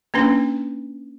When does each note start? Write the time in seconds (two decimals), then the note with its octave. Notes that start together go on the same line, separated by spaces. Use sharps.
0.14 A#3 C#4 D4 B4